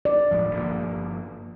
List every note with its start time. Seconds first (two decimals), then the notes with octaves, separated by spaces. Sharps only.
0.05 D5
0.31 D#1 A2 F3
0.53 G1 F3 A#3